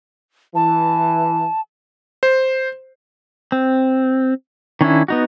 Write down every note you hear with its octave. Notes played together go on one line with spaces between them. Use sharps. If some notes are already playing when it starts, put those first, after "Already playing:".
E3 A5
C5
C4
D#3 C#4 D4 E4
B3 D#4 F#4